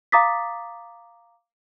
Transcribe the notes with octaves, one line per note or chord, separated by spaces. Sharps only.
F5 A#5 D6 D#6 A6 B6